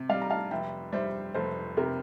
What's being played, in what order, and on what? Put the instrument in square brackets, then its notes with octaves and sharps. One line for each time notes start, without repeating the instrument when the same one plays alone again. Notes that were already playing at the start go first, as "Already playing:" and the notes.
Already playing: [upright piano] C3
[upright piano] G3 [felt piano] D5 F5
[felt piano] A#5
F5 A5
[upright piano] F1 [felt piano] E5 G5
[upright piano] G3 [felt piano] C5 E5
[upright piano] F1 [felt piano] A4 C5
[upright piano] C3 [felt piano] G4 A#4